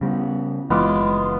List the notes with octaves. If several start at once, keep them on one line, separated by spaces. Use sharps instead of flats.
C#3 G3 B3
F#1 E3 G#3 B3 F4 D6